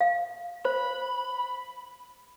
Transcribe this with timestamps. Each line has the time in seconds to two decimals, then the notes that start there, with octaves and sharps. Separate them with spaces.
0.01 F5
0.65 C5 B5